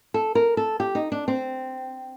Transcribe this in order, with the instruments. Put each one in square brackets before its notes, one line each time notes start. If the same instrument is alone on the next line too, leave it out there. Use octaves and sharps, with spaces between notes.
[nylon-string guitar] A4
A#4
A4
G4
D#4
D4
C4